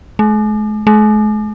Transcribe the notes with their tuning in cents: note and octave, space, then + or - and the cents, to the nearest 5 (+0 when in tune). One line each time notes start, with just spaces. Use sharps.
G#3 +45
G#3 +45